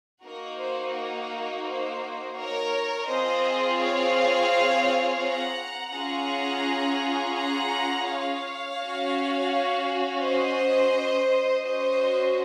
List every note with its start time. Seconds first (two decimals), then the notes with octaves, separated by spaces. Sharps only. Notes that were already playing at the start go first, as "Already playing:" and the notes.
0.23 A#3 D#4 F#4 A#4
0.59 C5
0.94 A#4
1.66 C5
2.37 A#4 C#5
3.08 C4 F4 G#4 C5 D#5
3.80 C#5 F5
5.22 F#5 A#5
5.93 C#4 F4 G#4 F#5 A#5
7.36 F#5 A#5
8.07 C#5 F5
8.79 C#4 F#4
10.21 C5 D#5
11.64 C#4 F#4 C5 D#5